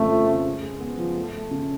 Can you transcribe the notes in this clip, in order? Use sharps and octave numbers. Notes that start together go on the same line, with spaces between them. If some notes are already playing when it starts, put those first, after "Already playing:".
Already playing: F2 C#3 A3
F3
C#3
G#3
G#3
B3
F3
A3
A3
C#3